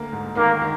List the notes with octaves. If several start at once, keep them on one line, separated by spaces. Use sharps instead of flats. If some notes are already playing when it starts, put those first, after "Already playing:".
Already playing: D2 D3 A#3
G#2
D#3 A#3
D#3